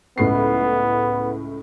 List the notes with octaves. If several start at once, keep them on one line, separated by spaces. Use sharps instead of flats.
C#2 A2 B3 C7